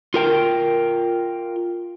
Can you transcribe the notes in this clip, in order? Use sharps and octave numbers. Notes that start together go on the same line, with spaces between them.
F4 A#4 G5